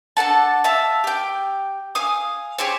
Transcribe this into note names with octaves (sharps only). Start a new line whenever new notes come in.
D4 A4 F#5 A5
E5 F5 A5 E6
G4 G5
F5 G#5 D#6
G4 G#4 C5 C#5